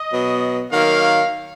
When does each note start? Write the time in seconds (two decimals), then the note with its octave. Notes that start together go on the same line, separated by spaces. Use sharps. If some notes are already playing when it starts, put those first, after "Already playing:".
Already playing: D#5
0.11 B2 F#3 B3
0.72 D#3 F#3 A#3 F5